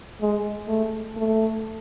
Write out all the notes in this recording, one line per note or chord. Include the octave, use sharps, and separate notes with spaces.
G#3
A3
A3